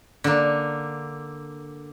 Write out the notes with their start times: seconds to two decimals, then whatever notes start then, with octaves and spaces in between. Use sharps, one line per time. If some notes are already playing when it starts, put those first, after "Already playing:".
0.24 D3 A#3